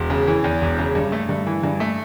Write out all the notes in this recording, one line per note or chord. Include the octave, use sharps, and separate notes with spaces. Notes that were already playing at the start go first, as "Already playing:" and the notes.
Already playing: E1
C#3
E3
E2
E1
C#3
G2
A3
G2
E3
G2
A3